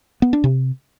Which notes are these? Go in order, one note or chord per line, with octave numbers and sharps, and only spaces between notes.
B3
D4
C3